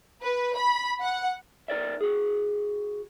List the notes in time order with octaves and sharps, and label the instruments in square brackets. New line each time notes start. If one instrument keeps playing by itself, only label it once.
[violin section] B4
B5
F#5
[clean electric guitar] D#4 A#4 D5 E5
F#4 G#4